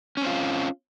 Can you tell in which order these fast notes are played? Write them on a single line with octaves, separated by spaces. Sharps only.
C#4 C4 F4